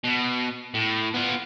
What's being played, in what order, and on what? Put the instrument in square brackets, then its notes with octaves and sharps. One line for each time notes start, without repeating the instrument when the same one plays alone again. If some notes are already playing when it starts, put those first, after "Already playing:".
[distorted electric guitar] B2
A2
B3 F4